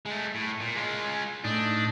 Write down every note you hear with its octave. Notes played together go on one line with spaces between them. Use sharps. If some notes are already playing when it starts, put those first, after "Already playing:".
G#3 A3
A2
A#2
G#3 F4
A2 D4 D#4